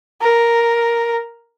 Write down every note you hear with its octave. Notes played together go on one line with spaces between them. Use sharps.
A#4